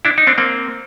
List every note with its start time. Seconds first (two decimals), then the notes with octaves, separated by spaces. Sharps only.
0.05 D4 E4
0.18 D#4
0.27 C4 D4
0.38 A#3 C4